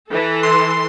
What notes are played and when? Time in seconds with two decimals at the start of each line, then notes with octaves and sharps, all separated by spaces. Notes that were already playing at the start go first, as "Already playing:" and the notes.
0.10 E3 A4
0.43 C6